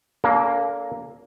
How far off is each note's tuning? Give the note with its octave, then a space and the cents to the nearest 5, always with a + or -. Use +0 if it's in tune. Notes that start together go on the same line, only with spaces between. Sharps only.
A#3 +0 D4 -40 A4 -20